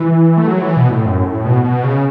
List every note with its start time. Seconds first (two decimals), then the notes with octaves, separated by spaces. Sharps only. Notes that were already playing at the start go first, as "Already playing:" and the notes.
Already playing: E3
0.37 A3
0.47 F#3
0.62 E3
0.77 B2
0.91 A2
1.05 F#2
1.25 A2
1.45 B2
1.64 B2
1.84 C#3